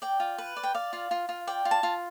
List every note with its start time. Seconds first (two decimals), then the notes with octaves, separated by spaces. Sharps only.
0.02 D5 G5
0.20 F4
0.38 B4
0.57 D5
0.63 G5
0.74 D5 F5
0.93 F4
1.11 F4
1.29 F4
1.47 D5 G5
1.65 F4
1.71 A5
1.83 F4